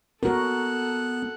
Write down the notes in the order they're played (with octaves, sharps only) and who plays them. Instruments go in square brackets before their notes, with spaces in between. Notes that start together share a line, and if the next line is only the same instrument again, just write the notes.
[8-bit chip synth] B3 [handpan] F#4 A#4 [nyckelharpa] A4 F#5